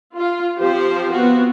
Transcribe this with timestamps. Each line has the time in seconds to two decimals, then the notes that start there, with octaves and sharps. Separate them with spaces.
0.16 F4
0.60 F3 C4 G4 C5
1.13 B3 C4 F4 F#4